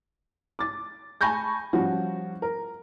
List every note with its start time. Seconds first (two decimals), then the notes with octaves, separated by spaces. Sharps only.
0.59 D6 A6
1.21 G#5 A5 B5 C#6 G6 A#6
1.73 F3 G3 C#4 F#4
2.42 A#4